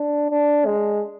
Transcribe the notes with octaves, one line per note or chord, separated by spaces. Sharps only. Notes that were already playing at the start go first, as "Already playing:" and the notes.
Already playing: D4
D4
G#3